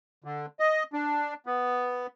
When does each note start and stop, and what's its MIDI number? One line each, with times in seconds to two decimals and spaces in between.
0.24 0.46 50
0.60 0.83 75
0.93 1.34 62
1.46 2.07 59